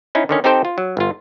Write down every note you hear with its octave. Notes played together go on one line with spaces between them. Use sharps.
C#4 D#4 E4
D3 D#3 C#4
C4 D#4 G4 A4 C5 G5
F4
F#3
G1 F4